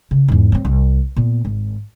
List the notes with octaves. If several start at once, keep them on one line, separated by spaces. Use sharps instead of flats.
C#3
E2 G#2
F#3 C4
C2
A#2 B3
G#1